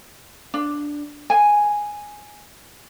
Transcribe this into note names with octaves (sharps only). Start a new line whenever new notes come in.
D4
G#5